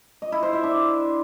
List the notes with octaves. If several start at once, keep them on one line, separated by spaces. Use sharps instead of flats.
D#5
E4
C5
E5
D4